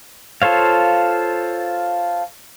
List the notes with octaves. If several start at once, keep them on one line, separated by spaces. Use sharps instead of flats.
F4 A4 C5 C#5 F5